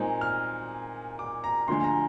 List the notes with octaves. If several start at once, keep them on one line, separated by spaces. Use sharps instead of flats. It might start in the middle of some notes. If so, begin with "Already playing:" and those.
Already playing: A#2 G#3 C4 D#4
F6
D6
A#5
D2 D3 F3 G#3 C6
A#5